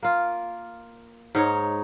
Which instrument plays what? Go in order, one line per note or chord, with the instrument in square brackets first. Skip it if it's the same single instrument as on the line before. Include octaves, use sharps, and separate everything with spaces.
[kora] A#3 F4
G#2 D#4 C#5